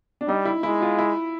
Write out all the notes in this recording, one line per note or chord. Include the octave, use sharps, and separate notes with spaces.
D4
G3 D#4
E4
G#3 E4
F4
E4